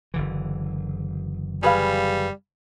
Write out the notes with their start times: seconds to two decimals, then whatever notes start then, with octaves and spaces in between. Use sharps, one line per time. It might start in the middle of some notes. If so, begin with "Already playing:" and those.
0.14 F#1 D3 E3
1.63 G3 G#4 B4 F5